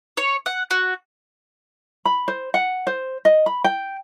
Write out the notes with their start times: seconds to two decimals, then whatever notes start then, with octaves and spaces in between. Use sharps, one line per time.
0.17 C#5
0.46 F#5
0.71 F#4
2.05 B5
2.28 C5
2.54 F#5
2.87 C5
3.25 D#5
3.46 B5
3.64 G5